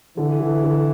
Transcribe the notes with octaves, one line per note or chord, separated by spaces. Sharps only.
D3 E3
D3
D3